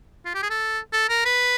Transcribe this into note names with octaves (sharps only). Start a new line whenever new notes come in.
F4
G4
G#4
A4
A4
A#4
B4